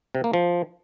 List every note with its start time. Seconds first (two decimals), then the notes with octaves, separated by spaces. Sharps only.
0.15 C3
0.24 A#3
0.33 F3